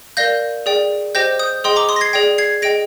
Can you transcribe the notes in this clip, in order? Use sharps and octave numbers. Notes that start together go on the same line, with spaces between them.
A#4 D5 F5 G6 A#6
G#4 D5 G5
G4 C5 D#5 G5 G6 A#6
D#6 G6
G#4 D#5 G5 C6 D#6
A#5 D6
C6 D#6
A#6
G#6 C7
G#4 D5 G5 A#6 D7
G#6 C7
G#4 D#5 G5 A#6 D7